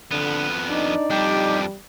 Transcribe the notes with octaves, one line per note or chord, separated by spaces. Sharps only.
F2 D3 B3
D4 D#4 D5
F2 G3 D4 G4